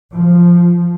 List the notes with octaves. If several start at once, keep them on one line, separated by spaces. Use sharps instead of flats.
F3